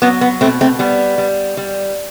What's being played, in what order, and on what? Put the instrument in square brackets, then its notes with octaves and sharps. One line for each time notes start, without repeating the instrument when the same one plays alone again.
[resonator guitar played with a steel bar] F#3 B3
B3
B2 A3 C4
A3 C4
G3 B3
G3
G3